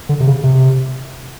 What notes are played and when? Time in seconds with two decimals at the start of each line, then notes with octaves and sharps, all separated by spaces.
0.09 D3
0.20 C3
0.27 C#3
0.43 C3